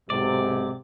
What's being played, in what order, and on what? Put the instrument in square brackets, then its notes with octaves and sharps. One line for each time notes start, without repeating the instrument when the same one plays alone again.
[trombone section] B1 G#2 C3 [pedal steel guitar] D5